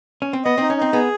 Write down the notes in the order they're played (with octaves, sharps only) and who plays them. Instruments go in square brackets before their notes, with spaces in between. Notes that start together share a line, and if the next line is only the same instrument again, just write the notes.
[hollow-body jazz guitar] C#4
C4
[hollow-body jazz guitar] B3 [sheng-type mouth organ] D#5
[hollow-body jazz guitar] C4 [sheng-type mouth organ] D#4
[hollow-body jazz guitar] C#4
[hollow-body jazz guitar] C4 [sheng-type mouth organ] D#4
[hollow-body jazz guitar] B3 [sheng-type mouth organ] G#4